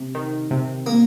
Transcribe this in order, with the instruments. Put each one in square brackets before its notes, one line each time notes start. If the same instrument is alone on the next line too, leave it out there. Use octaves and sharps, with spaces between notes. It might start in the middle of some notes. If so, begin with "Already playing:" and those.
Already playing: [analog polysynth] C3
D#3
C3
[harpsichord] A#3